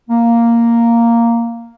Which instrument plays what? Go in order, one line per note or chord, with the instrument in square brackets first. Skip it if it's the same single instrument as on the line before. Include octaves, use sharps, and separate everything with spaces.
[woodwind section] A#3